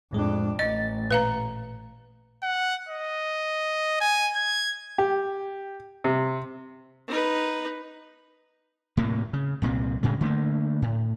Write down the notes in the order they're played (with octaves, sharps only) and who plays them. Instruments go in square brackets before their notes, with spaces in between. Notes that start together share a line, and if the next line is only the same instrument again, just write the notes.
[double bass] F2 D4 [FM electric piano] A2 G#3
[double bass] A1 [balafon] D#5 [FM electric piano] A6
[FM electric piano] A#2 [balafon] B4 F5 A#5
[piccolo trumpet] F#5
D#5
G#5
G#6
[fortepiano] G4
C3
[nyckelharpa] D#4 B4
[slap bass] A2 C3 A#3
C#3
C2 A#2 F#3 C4
D2 A2 C#3 G#3
D3 A3 A#3
A2